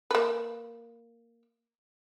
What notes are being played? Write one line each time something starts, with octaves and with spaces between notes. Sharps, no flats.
A#3 B4